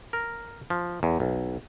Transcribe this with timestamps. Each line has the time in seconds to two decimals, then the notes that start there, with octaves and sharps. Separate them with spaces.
0.13 A#4
0.70 F3
1.03 E2
1.20 B1